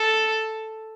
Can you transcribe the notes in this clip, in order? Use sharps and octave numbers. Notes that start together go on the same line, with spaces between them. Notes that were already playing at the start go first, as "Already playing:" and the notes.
Already playing: A4